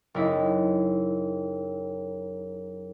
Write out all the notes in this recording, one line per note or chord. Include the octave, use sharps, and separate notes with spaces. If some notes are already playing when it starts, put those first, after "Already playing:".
F#1 D#4 E4